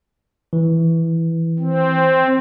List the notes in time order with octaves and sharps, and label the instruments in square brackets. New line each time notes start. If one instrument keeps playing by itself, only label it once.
[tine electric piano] E3
[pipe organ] C4